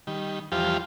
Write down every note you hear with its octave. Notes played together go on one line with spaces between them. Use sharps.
D#3 G3
E2 F3 G3 F4 G4 C5